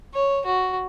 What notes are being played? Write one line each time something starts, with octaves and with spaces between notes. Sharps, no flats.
C#5
F#4